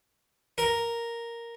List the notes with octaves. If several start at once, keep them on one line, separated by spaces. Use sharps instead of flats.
A#4